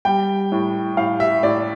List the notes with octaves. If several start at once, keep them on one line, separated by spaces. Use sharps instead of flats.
G3 G5
A2
A2 F5
E5
A2 D5